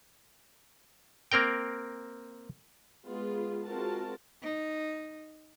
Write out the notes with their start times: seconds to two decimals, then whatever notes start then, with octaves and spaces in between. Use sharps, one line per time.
1.32 A#3 C4 A#4 G5
3.07 G#3 B3 F4 G#4
3.66 G#3 C4 F4 F#4 A#4 A5
4.42 D#4